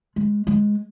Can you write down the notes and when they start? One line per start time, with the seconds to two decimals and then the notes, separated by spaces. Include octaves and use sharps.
0.16 G#3
0.47 G#3